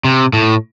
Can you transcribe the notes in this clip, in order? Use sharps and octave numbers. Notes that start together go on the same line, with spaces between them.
C3
A2